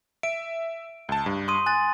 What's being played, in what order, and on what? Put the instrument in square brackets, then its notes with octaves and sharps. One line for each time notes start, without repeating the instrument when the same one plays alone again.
[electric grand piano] E5 [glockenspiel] D7
[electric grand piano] C#2 A5
G2
[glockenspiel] C6 D#6 D#7
[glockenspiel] G#5 A6 [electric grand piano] F#6